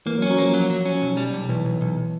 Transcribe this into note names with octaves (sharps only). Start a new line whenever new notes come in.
E3 A#3
F#3
C#4
F#3
F3 A#3
F#3
F#3
C#4
B1
G3
B1
B1 E3
B1
B1